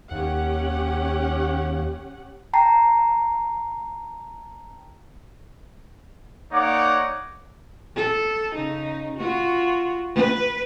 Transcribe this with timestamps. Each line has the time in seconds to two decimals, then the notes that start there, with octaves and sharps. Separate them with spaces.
0.11 D#2 C#4 G4 F#5
2.53 G5 A5 A#5 C7
6.53 A#3 D#4 C#5 D5 F#5 D6
7.96 A4
8.54 C#3 D#4
9.18 F4 F#4
10.15 B4